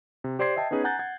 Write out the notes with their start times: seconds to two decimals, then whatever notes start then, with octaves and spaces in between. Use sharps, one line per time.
0.24 C3
0.39 G4 C5 D5 C6 G#6 C7
0.56 D#5 E5 G5 A5
0.71 B3 C#4 D#4 G#4 B4
0.84 F#5 G#5 A#5 F#6 G6 A6
0.99 F#5 G#6